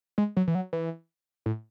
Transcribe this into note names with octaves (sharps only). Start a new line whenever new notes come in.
G#3
F#3
E3
F#3
E3
A2